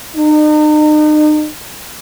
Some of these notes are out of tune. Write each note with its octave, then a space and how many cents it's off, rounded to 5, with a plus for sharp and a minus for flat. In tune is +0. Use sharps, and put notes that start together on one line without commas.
D#4 -40